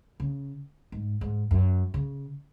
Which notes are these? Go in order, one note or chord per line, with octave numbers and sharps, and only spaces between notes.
C#3
G#2
G#2
F#2
C#3